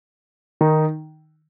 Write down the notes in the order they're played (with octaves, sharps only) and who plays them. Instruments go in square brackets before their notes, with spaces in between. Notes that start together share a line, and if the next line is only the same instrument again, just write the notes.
[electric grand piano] D#3 D#4